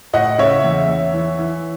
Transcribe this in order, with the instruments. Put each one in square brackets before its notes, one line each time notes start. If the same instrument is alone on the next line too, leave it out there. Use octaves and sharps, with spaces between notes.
[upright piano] A2 D#5 F#5
C#3 C#5 E5
E2
E2
E3
E3